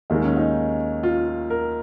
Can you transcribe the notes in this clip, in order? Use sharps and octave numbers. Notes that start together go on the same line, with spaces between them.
D#2 D#3 G#3 D#4
C#4
D#4
F4
A#4